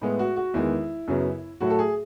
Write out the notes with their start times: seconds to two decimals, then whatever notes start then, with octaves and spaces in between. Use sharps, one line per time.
0.01 A2 G#3 B3
0.19 F#4
0.36 F#4
0.54 E2 D#3 G#3 B3 E4
1.08 F#2 C#3 F#3 B3
1.61 A2 F#3 A3 F#4
1.70 A4
1.79 G#4